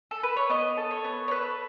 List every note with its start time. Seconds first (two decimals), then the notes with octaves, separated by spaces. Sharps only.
0.11 A4
0.23 B4
0.36 C#5
0.50 B3 D#5
0.77 A4
0.91 C#5
1.04 B3
1.28 C#5
1.31 A4 B4